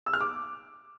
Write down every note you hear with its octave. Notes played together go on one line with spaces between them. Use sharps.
E6
F6
D6